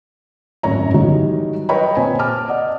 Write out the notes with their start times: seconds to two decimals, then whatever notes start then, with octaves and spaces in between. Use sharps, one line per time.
0.63 G#1 F#2 A2 C#5 A#5
0.94 D#3 E3 F#3 G3 B3
1.69 B4 C#5 D#5 G5 A#5 B5
1.97 A#2 C4 C5 G#5
2.19 A5 D6 F6
2.48 D5 D#5 F#5